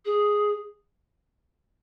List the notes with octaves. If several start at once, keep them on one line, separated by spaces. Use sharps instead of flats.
G#4